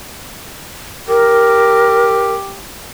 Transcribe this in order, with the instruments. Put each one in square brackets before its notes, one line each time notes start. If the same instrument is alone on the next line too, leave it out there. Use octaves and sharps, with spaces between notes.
[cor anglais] G4 [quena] A#4